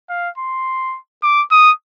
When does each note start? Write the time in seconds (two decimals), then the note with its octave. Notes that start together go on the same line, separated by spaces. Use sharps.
0.10 F5
0.38 C6
1.23 D6
1.52 D#6